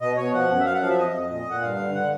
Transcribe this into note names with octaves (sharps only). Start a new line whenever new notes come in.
B2 D#5
B2 C#5
F3 F#5
F#2
E5
F#2 F5
F#5
F3 F5
E5
F2 D#5
F2
A#2
A#2 F#5
G2 F5
D3
D3 F#5